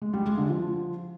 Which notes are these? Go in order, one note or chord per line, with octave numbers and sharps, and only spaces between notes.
G#3
G3
G#3
D3
F3